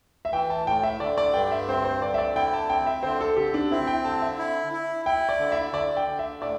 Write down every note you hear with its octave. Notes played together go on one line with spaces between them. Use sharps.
E5
E3 G5
A5
A2 G5
E5
D3 D5
D5
G2 G5
E5
C4 C5
C5
D3 D5
E5
D5
E4 G5
A5
C4 G5
E5
D3 C5
A4
D3 G4
D4
C4 E4
G5
D3 A5
E5
E4
E4
E4 G5
D5
D3
E5
D3 D5
G5
D3
E5
A2 D5